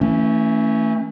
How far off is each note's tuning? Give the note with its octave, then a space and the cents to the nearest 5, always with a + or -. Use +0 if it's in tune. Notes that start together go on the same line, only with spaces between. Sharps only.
E3 -20 A3 +25 C#4 +0